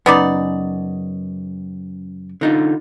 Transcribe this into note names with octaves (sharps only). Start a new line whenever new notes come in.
F#2 C#3 B3 D#4 D5
D3 D#4 F4